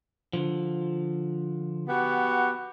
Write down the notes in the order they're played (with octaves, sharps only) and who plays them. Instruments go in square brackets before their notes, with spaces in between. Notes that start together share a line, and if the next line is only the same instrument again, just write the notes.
[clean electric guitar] D3 F3
[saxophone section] B3 F#4 G4